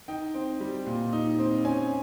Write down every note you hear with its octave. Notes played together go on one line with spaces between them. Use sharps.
D#4 G5
C4
G3
A#2
D#4
C4
C#4 G#5